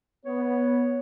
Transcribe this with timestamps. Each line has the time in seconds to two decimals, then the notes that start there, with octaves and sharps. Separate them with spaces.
0.26 B3 C#5